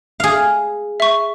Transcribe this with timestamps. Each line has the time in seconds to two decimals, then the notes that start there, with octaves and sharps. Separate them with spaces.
0.20 G#4 F5
1.00 E5 C#6